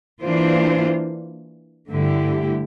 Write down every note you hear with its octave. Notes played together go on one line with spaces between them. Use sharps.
E3 A#3 D4 F4 C5
G2 D3 A3 E4 G4